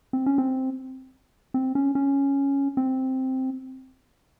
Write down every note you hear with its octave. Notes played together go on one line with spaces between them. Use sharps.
C4
C#4
C4
C4
C#4
C#4
C4